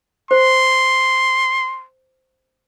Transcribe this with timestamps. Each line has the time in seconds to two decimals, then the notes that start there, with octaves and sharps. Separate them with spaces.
0.31 C5 C6